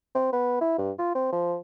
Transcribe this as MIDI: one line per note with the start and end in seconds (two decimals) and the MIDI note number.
0.15 0.32 60
0.33 0.56 59
0.61 0.74 64
0.78 0.91 43
0.99 1.11 65
1.15 1.31 60
1.32 1.56 53